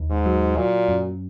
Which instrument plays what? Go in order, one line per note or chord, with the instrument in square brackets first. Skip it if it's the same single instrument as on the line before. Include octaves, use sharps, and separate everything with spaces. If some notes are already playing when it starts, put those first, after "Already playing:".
Already playing: [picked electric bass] D#2
[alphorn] G#2
[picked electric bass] F#3
[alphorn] A#2 [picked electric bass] F#3
[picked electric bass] F#2